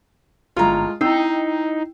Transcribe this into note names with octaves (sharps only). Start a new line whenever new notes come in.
G1 A2 G#3 F4 A#5
C4 D#4 E4 G5 E6 C7